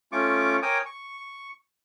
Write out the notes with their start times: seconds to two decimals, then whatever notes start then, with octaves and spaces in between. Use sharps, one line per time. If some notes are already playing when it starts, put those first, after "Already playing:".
0.12 A3 C#4 F4 C#6 D6
0.62 A#4 C#5 G5 G#5 D6 D#6
0.86 C#6